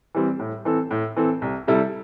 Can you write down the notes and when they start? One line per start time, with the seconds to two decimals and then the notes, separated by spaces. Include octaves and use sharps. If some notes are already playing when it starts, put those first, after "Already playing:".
0.15 E3 G3 C4
0.39 A2
0.65 E3 C4 A4
0.91 A2
1.17 E3 C4 A4
1.42 C2
1.67 C3 G3 E4 A4